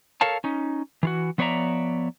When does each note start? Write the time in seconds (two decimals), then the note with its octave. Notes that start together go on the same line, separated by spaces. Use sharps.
0.21 A4 A#4 C#5 F5 A5
0.44 C#4 D#4
1.03 E3 F4 F#4
1.38 F3 B3 C#5 D5 E5 A#5